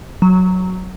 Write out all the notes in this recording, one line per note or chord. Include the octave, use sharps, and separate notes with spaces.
F#3